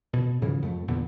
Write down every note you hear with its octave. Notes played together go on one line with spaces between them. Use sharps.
B2
G#2 C#3 E3 F3
F2 A3
E2 A#2 D3 B3